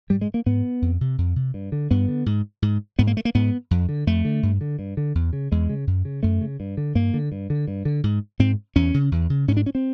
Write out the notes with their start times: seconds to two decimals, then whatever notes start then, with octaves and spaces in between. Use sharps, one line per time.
0.10 G#2 G3
0.21 G#3
0.34 A#3
0.46 G#2 B3
0.82 F2
1.01 C3
1.18 F2
1.36 C3
1.54 G2
1.72 D3
1.91 G2 B3
2.08 D3
2.26 G#2
2.62 G#2
2.99 G#2 B3
3.07 A#3
3.17 A3
3.25 A#3
3.35 G#2 B3
3.71 F2
3.89 D3
4.07 F2 A3
4.25 D3
4.43 G2
4.61 D3
4.79 G2
4.97 D3
5.15 E2
5.33 C#3
5.52 E2 G#3
5.69 C#3
5.87 F#2
6.05 C#3
6.23 F#2 A3
6.41 C#3
6.60 G2
6.77 D3
6.95 G2 A#3
7.14 D3
7.32 G2
7.50 D3
7.68 G2
7.85 D3
8.04 G#2
8.39 G#2 C4
8.76 E2 C#4
8.94 C#3
9.12 E2
9.30 C#3
9.48 G#2 C#4
9.57 D4
9.66 C#4
9.75 C4